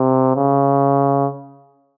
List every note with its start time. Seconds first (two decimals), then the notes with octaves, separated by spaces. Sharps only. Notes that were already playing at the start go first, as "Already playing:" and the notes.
Already playing: C3
0.35 C#3